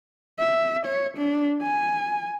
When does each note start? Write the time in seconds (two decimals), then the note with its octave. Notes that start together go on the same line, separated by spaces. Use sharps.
0.39 E5
0.86 C#5
1.17 D4
1.62 G#5